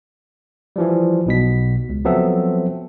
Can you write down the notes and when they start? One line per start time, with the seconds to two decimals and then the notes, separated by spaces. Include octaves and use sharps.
0.76 E3 F3 G3
1.26 B1 B2 B6
1.89 C#2
2.04 F3 F#3 B3 C4 A4 E5